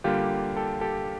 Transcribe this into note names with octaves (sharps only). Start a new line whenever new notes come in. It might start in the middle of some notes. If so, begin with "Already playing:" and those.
D3 G3 A#3 F4 G4
G4 A4
G4 A4